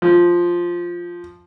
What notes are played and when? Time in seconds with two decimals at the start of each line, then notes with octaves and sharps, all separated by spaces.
0.02 F3